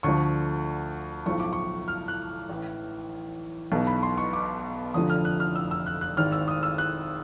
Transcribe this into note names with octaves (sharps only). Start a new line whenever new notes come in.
D2 D3 F3 C#6
B1 A2 F3 C#6
D6
C#6
F6
F#6
A1 A2 E3
B1 B2
B5
C6
C#6
D6
F1 F2 D3 F3 D#6
F6
F#6
F6
E6
E6
F#6
F#6
G#1 G#2 D#3 F6
E6
D#6
E6
F#6